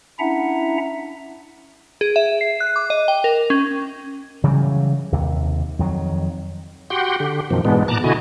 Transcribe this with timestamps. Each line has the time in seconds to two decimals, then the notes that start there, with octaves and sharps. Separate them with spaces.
0.19 C#4 D4 E4 E5 F#5 A#5
2.01 G#4
2.16 E5
2.41 C7
2.60 F#6
2.76 D6
2.90 D#5
3.08 G5
3.24 A#4
3.50 C#4
4.44 C#3 E3 F#3 G3
5.12 D#2 C3
5.79 F2 D#3 F#3
6.90 F#4 G4 F#5 G5 C6
7.20 D3 G4
7.51 F#2 B2 D#3 F3
7.65 G#2 B2 E3 G#3 B3 D4
7.88 A#2 A5 A#5 D6 F#6
8.04 B2 D3 E4 F#4 D#5 G#5